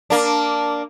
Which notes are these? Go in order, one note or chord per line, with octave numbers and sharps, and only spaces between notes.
A#3 D4